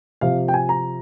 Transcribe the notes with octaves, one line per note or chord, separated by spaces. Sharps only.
C3 F3 F5
G5
G#5
A#5